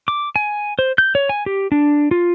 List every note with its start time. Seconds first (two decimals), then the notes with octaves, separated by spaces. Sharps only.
0.08 D6
0.36 G#5
0.79 C5
0.98 G6
1.15 C#5
1.29 G#5
1.46 G4
1.72 D4
2.11 F4